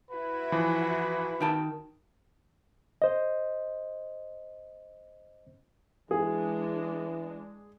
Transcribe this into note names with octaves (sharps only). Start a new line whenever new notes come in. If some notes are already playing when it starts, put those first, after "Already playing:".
E4 F#4 B4
E3 F3
D#3 G5 A5
C5 D#5
E3 G#3 D4 G#4